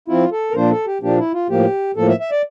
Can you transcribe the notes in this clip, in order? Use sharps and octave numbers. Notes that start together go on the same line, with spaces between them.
F3 C4 E4 F4
A4
A#4
A#2 F3 A#3 D4 C5
A4
G4
A#2 F3 A#3 D4 G4
E4
F4
A2 F3 A#3 G4
A2 F3 A#3 A4
E5
E5
D5